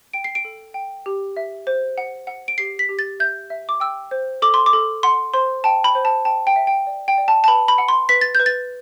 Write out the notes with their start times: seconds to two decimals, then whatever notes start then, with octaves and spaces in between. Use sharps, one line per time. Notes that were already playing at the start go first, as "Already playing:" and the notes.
0.13 G5 D7
0.24 C7
0.35 D7
0.45 A4
0.74 G5
1.06 G4
1.37 E5
1.67 C5
1.98 F#5
2.27 F#5
2.48 D7
2.58 G4 C7
2.79 B6
2.89 G4
2.99 A6
3.20 E5 G6
3.50 E5
3.69 D6
3.80 G5 E6
4.11 C5
4.42 A4 D6
4.54 C6
4.66 D6
4.73 A4
5.03 F#5 C6
5.34 C5 C6
5.64 G5 A5
5.84 B5
5.95 C5
6.05 A5
6.25 G5 A5
6.47 G5
6.56 E5
6.67 G5
6.87 D5
7.08 G5
7.18 D5
7.28 A5
7.44 A5
7.48 B4 B5
7.68 B5
7.78 F#5
7.88 C6
8.09 B4 B6
8.21 A6
8.35 B4 G6
8.46 A6